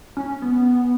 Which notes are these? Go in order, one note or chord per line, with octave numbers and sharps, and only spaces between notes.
C#4
B3